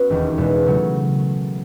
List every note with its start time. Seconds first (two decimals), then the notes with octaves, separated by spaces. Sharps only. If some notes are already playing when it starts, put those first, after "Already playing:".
Already playing: B3 C#4 F#4
0.10 E1 D#2 D#3
0.38 E2 B2 G#3
0.66 C#3 F#3 A3